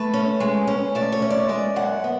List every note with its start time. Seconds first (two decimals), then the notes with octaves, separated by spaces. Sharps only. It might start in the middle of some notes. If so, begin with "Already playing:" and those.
Already playing: A3 B4
0.14 C#4
0.40 G#3
0.67 C#4
0.95 A3 D5
1.12 C#5
1.22 C#4
1.30 D5
1.49 G#3 D5
1.76 F#2 F#5
2.04 B3